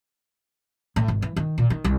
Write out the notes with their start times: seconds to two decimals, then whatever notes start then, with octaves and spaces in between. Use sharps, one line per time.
0.96 A2
1.08 G#1
1.22 E3
1.36 D#3
1.58 A#2
1.70 D#3
1.84 C2